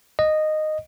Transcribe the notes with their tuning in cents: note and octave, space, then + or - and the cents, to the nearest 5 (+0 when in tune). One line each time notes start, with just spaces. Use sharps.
D#5 -10